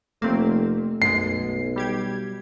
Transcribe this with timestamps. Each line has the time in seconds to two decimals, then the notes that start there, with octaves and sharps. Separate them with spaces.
0.22 F1 A3 A#3 C4
1.02 B1 F#2 G#3 C7
1.76 G3 G4 G#6